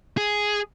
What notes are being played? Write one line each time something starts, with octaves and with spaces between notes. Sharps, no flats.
G#4